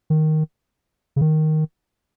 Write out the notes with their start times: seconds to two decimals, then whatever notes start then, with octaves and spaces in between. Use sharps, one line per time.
0.10 D#3
1.16 C#3
1.21 D#3